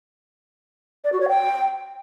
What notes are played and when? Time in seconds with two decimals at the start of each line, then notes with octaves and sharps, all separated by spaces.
1.04 D5
1.12 F#4
1.20 C#5
1.29 G5